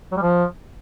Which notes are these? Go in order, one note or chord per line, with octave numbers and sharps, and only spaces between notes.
F#3
G3
F3